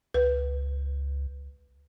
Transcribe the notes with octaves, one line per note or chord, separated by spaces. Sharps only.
C#2 B4